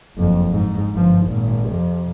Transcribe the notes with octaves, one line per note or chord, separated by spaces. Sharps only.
F#1 F2
G#2
G1 F3
G#1 A#2
F2 C3